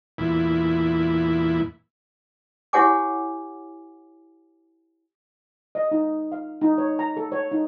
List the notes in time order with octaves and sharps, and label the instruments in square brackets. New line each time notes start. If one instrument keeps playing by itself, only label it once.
[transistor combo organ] E2 A#2 E4
[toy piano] E4 G4 C#5 F#5 G#5 D6
[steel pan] D#5
D#4
F5
D#4
C#5
A#5
A4
C#5
D#4